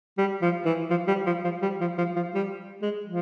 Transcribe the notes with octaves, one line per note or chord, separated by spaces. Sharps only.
G3
F3
E3
F3
G3
F3
F3
G3
F3
F3
F3
G3
G#3
F3